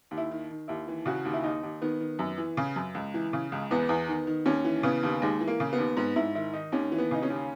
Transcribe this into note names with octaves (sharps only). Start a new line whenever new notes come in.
D#2
E4
D#3
D#3
D#2 E4
E3
C#3 F#4
D#2
E4
D#2 D#4
D#2
D#3 B3
D#3
F#2
E3
C#3
F#2
C#2
E3
C#3
C#2
E2 B3
E2
D#3
D#3
D#2 C#4
E3
C#3 B3
D#2
D#2 G#3
E3
A#3
C#3
B3
D#2
G#2 B3
G#2 E4
D#3 E4
D#3 D#4
D#2 C#4
E3
B3
C#3 D#4
C#4
D#2